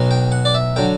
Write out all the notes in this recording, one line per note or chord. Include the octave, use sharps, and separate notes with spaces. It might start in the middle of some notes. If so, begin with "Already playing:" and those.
Already playing: B1 B2 F#3
G5
F#5
D5
E5
D3 F#3 G5